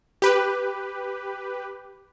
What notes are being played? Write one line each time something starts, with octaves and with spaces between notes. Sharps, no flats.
G4 B4